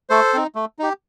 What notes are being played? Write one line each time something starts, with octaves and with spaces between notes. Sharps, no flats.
A3 A4 C5
C4 D#4
A3
D#4 G4